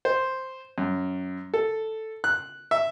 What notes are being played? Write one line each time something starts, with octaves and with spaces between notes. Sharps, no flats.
C5
F#2
A4
F#6
E5